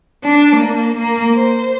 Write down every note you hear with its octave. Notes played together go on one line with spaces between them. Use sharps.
D4
A#3
A#3
C5